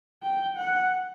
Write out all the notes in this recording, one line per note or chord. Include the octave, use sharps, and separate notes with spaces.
G5
F#5